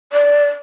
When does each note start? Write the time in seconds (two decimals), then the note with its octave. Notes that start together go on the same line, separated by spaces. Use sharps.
0.13 D5